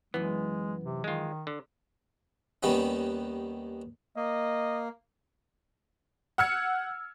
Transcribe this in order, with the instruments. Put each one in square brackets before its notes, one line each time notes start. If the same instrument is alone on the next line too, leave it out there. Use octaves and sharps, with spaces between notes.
[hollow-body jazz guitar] F#2 E3 [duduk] G#3 [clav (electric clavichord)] B3
[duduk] C3
[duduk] D#3 [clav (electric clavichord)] G#3 F4
[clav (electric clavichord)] D3
[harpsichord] D#2 D#3 G3 B3 C#4
[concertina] A#3 [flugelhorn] D#5
[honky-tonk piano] F#5 E6 F6 G#6 C#7